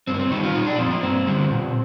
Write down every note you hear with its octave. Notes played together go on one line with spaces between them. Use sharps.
G2 C4
A#3
C4
D#3 G3 D#4
F4
A#2 D#4
D4
F3 C4
A#3
G2 C4
D3 G3
A#2